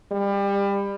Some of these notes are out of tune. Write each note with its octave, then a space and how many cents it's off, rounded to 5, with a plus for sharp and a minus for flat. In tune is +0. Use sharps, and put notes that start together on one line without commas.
G3 +25